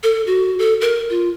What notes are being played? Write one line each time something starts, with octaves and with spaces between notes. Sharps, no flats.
A4
F#4
A4
A#4
F4